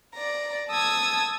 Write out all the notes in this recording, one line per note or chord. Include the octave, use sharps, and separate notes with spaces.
D5 A#5
A5 D#6 E6 G#6